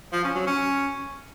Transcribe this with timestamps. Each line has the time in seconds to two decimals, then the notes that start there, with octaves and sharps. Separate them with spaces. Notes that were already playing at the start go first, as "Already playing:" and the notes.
0.13 F3
0.24 C#4
0.35 F#3
0.47 C#4